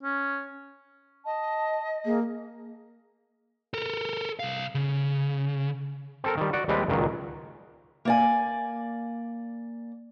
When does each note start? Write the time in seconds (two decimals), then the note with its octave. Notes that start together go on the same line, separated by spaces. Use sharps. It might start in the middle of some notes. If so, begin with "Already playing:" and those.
0.03 C#4
1.25 D#5 A5
2.05 A#3 G#4
3.74 A4 A#4
4.39 C2 F5
4.75 C#3
6.24 C4 A4 A#4
6.37 D#3 G3
6.53 F#4 D5 F#5
6.68 D#2 G3 G#3 C4 B4
6.88 C#2 A#2 D#3 F#3
8.05 A#3 D5 G#5